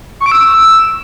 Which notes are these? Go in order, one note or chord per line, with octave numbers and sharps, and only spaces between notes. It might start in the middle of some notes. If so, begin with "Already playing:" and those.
C#6
D7
E6